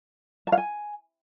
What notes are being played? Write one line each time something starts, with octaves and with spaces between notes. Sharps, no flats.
A5
F5
G#5